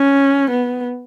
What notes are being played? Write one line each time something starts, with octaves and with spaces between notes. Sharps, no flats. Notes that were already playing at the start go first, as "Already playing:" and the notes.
Already playing: C#4
B3